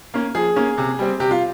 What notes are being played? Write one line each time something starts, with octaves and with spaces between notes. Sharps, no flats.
A#3 C#4
F3 G#4
A#3 C#4
C3
G3 C4
C3 G4
F4